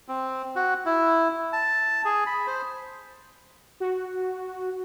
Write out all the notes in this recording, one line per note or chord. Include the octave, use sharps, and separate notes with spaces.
C4
F#4
E4
A5
G#4
B5
C5
F#4